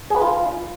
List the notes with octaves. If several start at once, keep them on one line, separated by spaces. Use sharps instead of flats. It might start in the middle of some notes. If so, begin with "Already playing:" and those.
G#4
B4
F4